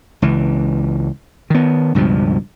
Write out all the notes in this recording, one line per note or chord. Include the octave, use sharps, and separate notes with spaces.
C#2 E3
D#3 B3
C#2 G2 B2 F3